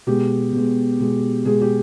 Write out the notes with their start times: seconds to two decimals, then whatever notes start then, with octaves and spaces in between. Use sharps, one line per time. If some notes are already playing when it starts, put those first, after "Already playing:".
0.07 B2 G#3 G4
0.53 B2 G#3
1.00 B2 G#3
1.45 B2 G#3 G#4
1.61 G4